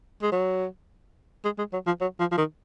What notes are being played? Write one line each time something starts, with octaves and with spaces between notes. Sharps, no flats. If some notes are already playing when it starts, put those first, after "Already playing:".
G#3
F#3
G#3
G#3
F#3
F3
F#3
F3
F3
D#3